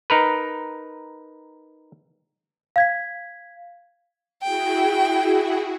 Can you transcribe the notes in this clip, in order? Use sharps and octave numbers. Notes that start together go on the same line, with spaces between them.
D#4 A#4 B4
F5 G#6 B6
E4 F#4 G#4 G5